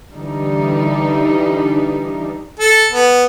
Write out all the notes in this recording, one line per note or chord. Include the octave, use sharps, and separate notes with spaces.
D3 E3 G3 D4 D#4
A4
B3